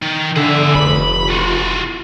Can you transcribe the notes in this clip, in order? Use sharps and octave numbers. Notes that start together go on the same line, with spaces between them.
D#3
D3 G#4 E5
F1 B5
F4 F#4